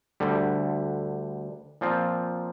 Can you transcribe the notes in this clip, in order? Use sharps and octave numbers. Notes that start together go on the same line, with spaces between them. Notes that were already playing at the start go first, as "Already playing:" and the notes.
D2 D3 G3
A#2 F3 C4 F4